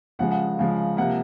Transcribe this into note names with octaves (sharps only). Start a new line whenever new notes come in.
C#3 F3 G#3 F#5
F#5
C#3 F3 G#3
C3 F3 A#3 F#5